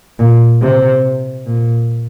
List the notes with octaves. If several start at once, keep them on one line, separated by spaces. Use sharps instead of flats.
A#2
C3
A#2